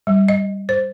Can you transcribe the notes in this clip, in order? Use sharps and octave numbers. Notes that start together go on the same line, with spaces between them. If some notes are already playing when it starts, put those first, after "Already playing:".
G3
D#5
C5